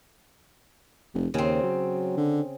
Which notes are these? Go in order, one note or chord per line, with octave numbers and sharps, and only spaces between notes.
F1
D#2 C#3 C4
F#3
D3